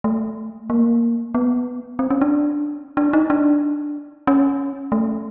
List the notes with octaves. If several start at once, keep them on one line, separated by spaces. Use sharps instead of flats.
A3
A#3
B3
C4
C#4
D4
D4
D#4
D4
C#4
A3